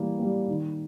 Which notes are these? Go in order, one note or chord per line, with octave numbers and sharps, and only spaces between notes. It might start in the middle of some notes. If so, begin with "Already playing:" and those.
Already playing: E3 G3 A#3
G3 A#3
D#3